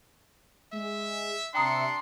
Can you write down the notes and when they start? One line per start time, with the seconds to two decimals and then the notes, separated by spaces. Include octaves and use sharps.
0.72 G#3 E5
1.54 C3 D4 E5 G5 A#5 C6 D#6 C#7